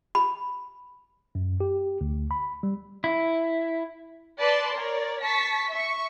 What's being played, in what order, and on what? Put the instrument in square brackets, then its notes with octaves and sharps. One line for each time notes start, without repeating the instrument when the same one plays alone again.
[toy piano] B5
[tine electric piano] F#2
G4
D2
B5
G3
[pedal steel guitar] E4
[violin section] B4 D5 A5 C6
A#4 C#5 D5
A5 C#6 B6
E5 C#6